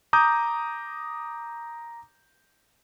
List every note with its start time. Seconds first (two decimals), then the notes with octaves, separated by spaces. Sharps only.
0.13 A#5 D6 D#6 G6